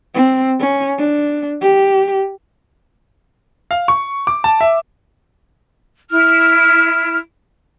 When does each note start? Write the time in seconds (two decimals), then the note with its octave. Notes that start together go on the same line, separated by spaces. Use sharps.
0.14 C4
0.59 C#4
0.99 D4
1.61 G4
3.71 F5
3.88 C#6
4.27 D6
4.44 A5
4.61 E5
6.11 E4 F6